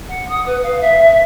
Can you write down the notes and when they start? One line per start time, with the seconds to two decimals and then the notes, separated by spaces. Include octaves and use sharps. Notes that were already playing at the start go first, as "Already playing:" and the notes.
0.08 F#5
0.28 D#6
0.46 B4
0.63 F5
0.81 E5